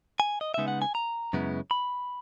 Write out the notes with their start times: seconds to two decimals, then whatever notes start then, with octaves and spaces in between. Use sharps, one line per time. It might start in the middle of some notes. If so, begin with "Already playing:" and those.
0.20 G#5
0.41 D#5
0.54 C#3 G#3 B3 D#4 E5
0.68 F#5
0.82 G#5
0.95 A#5
1.33 F#2 C#3 G#3 B3 E4
1.71 B5